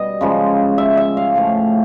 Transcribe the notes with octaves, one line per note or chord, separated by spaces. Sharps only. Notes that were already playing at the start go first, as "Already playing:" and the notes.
Already playing: B2 G3 D#5
C#3 F3 G#3
E5
E5
F5
A2 F3 A3